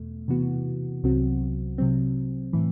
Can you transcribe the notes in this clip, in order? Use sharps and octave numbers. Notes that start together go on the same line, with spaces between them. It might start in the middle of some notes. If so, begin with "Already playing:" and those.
Already playing: E2 B2 A3
C3 E3 B3 F#4
C2 C3 F#3 C4 F#4
C3 F#3 C4
A2 E3